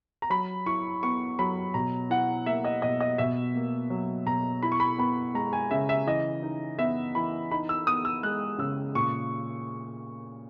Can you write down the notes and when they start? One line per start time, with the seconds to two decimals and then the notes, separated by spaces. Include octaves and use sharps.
0.22 A#5
0.30 F#3 B5
0.66 E4 C#6
1.03 B3 C#6
1.39 F#3 B5
1.74 B2 A#5
2.10 E4 F#5
2.46 A#3 E5
2.65 D#5
2.82 B2 D#5
3.01 D#5
3.18 B2 E5
3.55 A#3
3.90 F#3
4.26 B2 A#5
4.63 E4 B5
4.72 C#6
4.80 B5
4.98 B3 B5
5.34 G#3 A#5
5.53 G#5
5.71 C#3 E5
5.89 E5
6.07 E3 D#5
6.43 D#4
6.79 B3 E5
7.15 E3 B5
7.51 D#4 B5
7.69 E6
7.87 B3 D#6
8.05 E6
8.23 G#3 F#6
8.59 C#3 E6
8.95 A#2 C#6